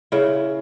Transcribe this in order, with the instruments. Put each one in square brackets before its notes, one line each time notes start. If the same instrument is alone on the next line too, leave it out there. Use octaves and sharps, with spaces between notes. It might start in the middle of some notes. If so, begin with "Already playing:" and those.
[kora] C#3 E4